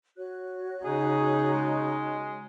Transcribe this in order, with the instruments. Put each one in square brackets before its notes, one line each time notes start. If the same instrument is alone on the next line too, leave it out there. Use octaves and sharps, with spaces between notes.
[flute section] F#4 C#5 F#6
[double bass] C#3 D#4 [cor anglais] G#4
[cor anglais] G#3